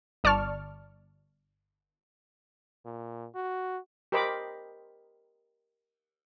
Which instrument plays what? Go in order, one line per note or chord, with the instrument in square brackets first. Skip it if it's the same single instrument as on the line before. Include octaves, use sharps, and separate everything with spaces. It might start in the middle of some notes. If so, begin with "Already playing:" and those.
[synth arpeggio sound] G1 D5 A5 C#6 F6
[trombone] A#2
F#4
[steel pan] G4 A#4 C5 D#5 B5 D6